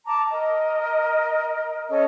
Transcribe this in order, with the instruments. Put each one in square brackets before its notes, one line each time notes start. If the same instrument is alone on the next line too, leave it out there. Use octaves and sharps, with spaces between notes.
[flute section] A5 A#5 D6
A#4 D#5
C#4 A4 D#5